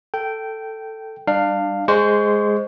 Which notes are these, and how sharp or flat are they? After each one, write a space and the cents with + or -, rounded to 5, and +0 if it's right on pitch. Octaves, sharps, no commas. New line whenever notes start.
A4 +10 G5 -10
G3 +0 D4 +25 F5 +0
G#3 +0 C5 +0 C#6 +25